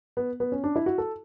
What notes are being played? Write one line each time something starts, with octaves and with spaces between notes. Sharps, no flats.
B3
B3
C#4
D4
E4
F#4
A4